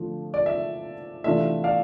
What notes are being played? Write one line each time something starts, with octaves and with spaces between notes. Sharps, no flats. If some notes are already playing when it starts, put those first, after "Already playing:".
Already playing: D3 F3 A3 C4 F4
D5
E5
C3 E3 A3 D4 F4 E5
D5 F5